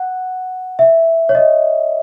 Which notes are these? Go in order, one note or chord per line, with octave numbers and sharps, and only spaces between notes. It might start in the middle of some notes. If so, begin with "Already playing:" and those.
Already playing: F#5
E5
C#5
D#5